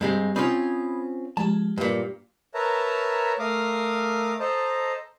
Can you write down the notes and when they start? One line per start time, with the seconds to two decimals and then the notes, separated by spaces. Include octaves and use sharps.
0.01 G2 G3 G#3 C4
0.36 C4 C#4 F4 B5 D#6 G#6
1.37 F3 G#3 G4 A5
1.78 G2 A#2 B4
2.54 A#4 B4 C#5 E5 A5 A#5
3.39 A3 A#4 F5 D6 D#6
4.40 A4 C5 D#5 A5 A#5